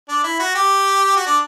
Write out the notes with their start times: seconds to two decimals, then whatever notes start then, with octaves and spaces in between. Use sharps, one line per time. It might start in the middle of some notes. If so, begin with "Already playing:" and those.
0.09 D4
0.24 E4
0.39 F#4
0.55 G4
1.16 F#4
1.26 D4